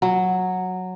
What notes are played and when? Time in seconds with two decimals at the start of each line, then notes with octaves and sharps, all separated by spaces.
0.02 F#3